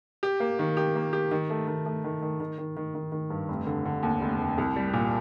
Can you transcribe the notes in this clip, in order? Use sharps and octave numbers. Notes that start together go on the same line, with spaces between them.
G4
A#3
D#3
G4
A#3
G4
D#3
A3
D#3
A3
D#3
D#3
D#3
D#3
D#3
D#3
D#3
G2
F1
D3
D3
D#2
F1
F1
C2
G3
A#2